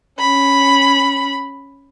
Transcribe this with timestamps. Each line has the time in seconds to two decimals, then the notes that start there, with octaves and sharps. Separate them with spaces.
0.19 C#4 B5